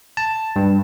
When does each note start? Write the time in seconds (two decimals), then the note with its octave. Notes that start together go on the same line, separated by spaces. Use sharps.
0.17 A5
0.56 G2